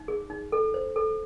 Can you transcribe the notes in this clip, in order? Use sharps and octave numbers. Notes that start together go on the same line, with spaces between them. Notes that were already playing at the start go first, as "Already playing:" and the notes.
Already playing: D#4
G#4
D#4
A4
C5
A4